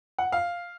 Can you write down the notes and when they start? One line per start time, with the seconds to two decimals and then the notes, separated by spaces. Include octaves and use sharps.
0.19 F#5
0.32 F5